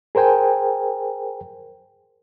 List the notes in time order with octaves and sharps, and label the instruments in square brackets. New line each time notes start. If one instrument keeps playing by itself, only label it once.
[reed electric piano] G#4 A#4 C5 G5 G#5